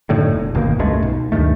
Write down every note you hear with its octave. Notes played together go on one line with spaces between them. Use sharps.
F#2 A2 D3 D#3
E1
G1 B2 D#3 A#3
C#2 G2 G#3 A3
B1
D2 G2 D#3 A3